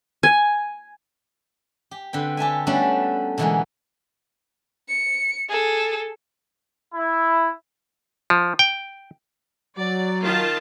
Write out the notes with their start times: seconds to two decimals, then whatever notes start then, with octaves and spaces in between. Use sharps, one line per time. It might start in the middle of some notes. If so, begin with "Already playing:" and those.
0.23 G#5
1.91 G4
2.13 D3 C4 B4 G5
2.37 G4 A4 E5 G#5
2.67 G3 A3 B3 C#4 D4 F#4
3.38 B2 D3 E3 G#3 A#3 B3
4.89 C#7
5.49 G#4 A4
6.94 E4
8.30 F3
8.59 G5
9.78 F#3 D5
10.23 D#3 F4 A5